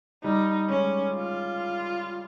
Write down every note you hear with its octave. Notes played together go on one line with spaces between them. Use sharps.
G3 D#4
G#3 C#4
F4